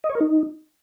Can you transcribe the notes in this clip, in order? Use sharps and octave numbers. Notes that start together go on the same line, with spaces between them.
D#5
C#5
A#4
D#4